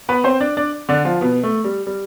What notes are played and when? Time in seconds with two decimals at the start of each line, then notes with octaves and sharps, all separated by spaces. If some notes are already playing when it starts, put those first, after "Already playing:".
0.09 B3 B4
0.24 C4 C5
0.40 D4 D5
0.57 D4 D5
0.89 D3 D4
1.05 F3 F4
1.21 B2 B3
1.43 A3
1.64 G3
1.87 G3